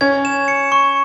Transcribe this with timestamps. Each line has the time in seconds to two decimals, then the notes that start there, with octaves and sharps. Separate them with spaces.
0.01 C#4 G#6
0.25 E7
0.48 C#7
0.72 C#6